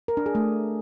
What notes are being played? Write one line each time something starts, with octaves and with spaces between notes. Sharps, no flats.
A#4
D4
G#4
A3